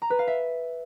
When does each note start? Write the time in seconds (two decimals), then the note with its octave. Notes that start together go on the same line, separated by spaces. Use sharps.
0.02 A#5
0.10 B4
0.19 F5
0.27 E5